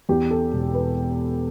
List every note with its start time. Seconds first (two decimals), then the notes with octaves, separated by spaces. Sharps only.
0.09 E2 G4
0.31 A4
0.53 E1
0.74 B4